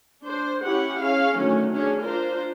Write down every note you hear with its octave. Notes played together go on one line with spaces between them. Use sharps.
D4 C5
C#4 E4 G4 F#5
C#4 G#4 F5
D3 D#3 F#3 A3 C#4
C#4 D4 G#4
D4 F4 A#4 C5